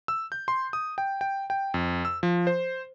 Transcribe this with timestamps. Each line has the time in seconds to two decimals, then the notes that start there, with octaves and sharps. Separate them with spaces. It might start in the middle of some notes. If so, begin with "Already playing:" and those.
0.08 E6
0.32 G6
0.48 C6
0.73 D#6
0.98 G5
1.21 G5
1.50 G5
1.74 F2
2.05 E6
2.23 F3
2.47 C5